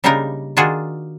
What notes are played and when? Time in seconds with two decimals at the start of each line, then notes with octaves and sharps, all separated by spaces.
0.04 C#3 G3 A#3 D4 D#4 A#4
0.57 D#3 D4 F4 F#4 G#4